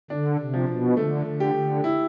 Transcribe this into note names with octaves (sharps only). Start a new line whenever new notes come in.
D3 D4
C3
F3
B2
D3 A3
D3
G4
D3
E4